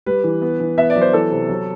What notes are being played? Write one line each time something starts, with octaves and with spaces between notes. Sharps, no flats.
G3 B4
E3
B3
E3
B3 E5
D5
F#3
C5
E3 A4
C3
F#3